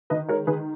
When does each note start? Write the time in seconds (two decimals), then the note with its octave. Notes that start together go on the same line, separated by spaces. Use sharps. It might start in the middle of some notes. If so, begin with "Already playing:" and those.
0.10 D#3 B4 D#5
0.29 G#3 A#4 C#5
0.47 D#3 G#4 B4